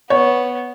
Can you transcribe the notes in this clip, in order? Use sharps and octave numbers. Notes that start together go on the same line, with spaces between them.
B3 C#5